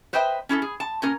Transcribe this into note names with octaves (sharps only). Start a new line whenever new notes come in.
B4 C5 D#5 E5 G5
C#4 E4 G#4 A4
G#4
A5
A#2 C#4 A#4